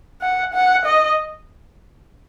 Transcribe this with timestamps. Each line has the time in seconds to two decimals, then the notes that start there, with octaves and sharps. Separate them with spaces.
0.21 F#5
0.54 F#5
0.86 D#5